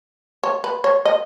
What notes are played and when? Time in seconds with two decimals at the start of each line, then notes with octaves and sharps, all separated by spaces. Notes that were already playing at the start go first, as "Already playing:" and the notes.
0.44 C#5
0.64 B4
0.84 C#5
1.05 D#5